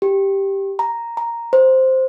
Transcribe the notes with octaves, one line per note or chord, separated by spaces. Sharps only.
G4
A#5
A#5
C5